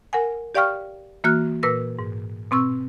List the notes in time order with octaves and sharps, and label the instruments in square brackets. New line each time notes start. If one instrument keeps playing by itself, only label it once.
[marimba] A#4 F#5 G#5
G4 D5 F5 G5 C#6 F6
E3 A#3 F#4 F6 F#6
A#2 B4 E6 A#6
G#2
B2 C4 C#6 E6